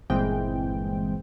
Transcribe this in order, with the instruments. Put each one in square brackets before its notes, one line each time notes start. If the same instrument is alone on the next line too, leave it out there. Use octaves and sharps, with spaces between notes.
[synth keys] G1 A#2 E3 G#3 C4 G5